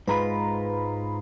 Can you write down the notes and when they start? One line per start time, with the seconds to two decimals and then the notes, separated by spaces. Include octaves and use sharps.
0.08 G#2 G#3 F4 B4 A#5 B5